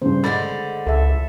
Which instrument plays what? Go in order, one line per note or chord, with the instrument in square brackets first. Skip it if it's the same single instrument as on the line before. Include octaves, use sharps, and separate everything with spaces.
[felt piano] G2 C#3 [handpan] C5
[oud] D3 G#3 [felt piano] B5 A6
[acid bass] C#2 [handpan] A4 E5